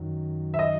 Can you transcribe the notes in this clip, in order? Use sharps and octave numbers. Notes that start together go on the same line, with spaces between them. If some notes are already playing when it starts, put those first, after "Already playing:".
Already playing: F#2 D#3 F#3
E5
D#5